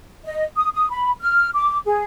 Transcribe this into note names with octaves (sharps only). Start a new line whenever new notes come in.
D#5
D#6
D#6
B5
F6
D6
G#4